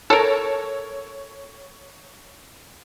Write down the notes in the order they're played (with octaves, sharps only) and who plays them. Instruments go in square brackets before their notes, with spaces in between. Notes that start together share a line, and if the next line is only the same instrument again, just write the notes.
[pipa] A4 A#4 [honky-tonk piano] C#5